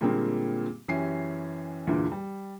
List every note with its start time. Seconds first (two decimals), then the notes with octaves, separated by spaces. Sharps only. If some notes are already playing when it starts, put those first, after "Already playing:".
0.01 A#2 D3 G3 G#3 A#3 C4
0.88 F#2 E3 C#4 G4 G#5 C7
1.87 E2 G2 A#2 D3 E3
2.12 G3